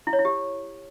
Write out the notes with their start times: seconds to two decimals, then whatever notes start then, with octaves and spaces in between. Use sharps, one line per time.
0.07 E4
0.13 C#5
0.19 E4
0.25 G4